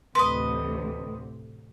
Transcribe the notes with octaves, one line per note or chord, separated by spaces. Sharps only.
A1 D2 C3 B4 D#5 C6